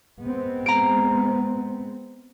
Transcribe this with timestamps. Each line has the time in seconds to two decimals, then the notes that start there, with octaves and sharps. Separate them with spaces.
0.21 G#3 B3 C4
0.66 A#5 D7